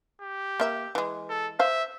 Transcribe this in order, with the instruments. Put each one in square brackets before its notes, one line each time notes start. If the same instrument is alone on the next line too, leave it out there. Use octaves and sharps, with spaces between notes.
[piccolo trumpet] G4
[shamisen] A#3 E5
E3 G#3
[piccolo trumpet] A4
[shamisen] C5 F5 [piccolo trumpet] E5